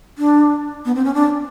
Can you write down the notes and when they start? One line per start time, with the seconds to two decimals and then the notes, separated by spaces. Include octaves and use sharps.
0.18 D4
0.85 B3
0.95 C4
1.05 C#4
1.14 D4